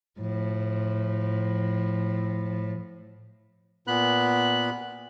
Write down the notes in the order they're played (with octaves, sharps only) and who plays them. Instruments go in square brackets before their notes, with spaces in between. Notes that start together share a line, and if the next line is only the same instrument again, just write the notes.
[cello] A2 F3
[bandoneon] A#2 B3 B5 F#6